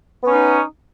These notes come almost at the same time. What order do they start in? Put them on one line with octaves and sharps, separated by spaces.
B3 C#4 D#4